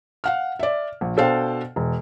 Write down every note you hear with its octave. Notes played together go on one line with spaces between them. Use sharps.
F5 F#5 F6
D5 E5
A#1
B2 D4 A4 C5 F5 G5
E1